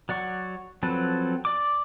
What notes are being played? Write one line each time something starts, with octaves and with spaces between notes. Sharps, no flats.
F#3 D5 F#5 C#6
F3 F#3 C4 A4 B4
D5 D6